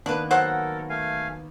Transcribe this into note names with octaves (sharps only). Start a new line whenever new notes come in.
D#3 A#3 B3 D4 B4
F#3 A4 A#4 C5 F#5
A3 F5 G#5